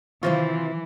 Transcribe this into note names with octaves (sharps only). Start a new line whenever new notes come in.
C3 D#3 E3 C4 F4 C5 F5